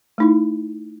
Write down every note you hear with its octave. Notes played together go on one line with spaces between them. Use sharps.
A3 D#4 E4